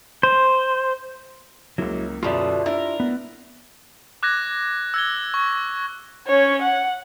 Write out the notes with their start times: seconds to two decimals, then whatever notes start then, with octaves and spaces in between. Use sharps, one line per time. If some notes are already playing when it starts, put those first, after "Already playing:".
0.23 C5
1.78 C#2 F#3 A#3 E4
2.23 F#2 B2 D3 F4 G4 E5
2.66 D4 E4 A#4
3.00 B3
4.23 D6 F#6 G#6 A#6
4.94 E6 G#6 G7
5.34 C#6
6.27 C#4 C#5
6.62 F#5